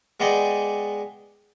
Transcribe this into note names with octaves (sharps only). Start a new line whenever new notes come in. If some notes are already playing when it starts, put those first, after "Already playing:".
G#3 B3 D5 D#5 G5 G#5